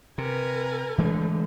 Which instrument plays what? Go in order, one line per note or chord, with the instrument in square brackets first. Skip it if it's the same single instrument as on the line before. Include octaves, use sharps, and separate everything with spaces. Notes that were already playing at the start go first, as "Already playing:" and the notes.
[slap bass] C3 [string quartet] A#4 B4 G#5
[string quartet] D3 [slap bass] E3 G#3 A3